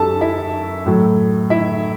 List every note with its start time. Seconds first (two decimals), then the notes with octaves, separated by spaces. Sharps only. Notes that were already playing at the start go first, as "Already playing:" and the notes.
Already playing: F#2 F#3 G4 A4 A5
0.21 E4 E5
0.86 A2 F#3
1.50 E4 E5